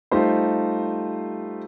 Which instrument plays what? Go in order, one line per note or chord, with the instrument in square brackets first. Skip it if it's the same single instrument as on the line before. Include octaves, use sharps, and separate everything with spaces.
[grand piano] G3 A3 D#4 F4 G4 C5